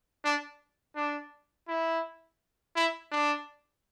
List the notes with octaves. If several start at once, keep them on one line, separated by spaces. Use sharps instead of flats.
D4
D4
E4
E4
D4